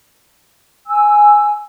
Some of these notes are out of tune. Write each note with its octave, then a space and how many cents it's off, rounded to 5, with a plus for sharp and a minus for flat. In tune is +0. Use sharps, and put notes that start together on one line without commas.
G#5 +0 E6 +0